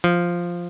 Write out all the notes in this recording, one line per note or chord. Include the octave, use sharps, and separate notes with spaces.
F3